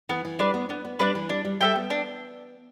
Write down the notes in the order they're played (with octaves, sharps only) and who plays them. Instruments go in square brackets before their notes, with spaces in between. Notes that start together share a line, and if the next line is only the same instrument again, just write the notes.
[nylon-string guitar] E3 [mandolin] B3
[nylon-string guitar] E3
[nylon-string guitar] G3 [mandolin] D4 B4 D5
[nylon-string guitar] B3
[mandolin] B3 [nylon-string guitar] D4
[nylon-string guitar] B3
[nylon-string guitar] G3 [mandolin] D4 B4 D5
[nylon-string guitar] E3
[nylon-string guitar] G3 [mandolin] D4
[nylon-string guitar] G3
[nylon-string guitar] G3 [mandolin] A4 E5 G5
[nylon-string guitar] B3
[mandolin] D4